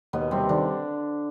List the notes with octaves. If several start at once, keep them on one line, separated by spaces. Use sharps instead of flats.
D#2 B2 B3
C3 G3 C4
D3 D#3 D4